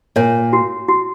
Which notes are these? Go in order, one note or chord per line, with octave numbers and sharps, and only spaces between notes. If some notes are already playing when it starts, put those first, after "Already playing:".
A#2 A#3 C#5
F#4
F#4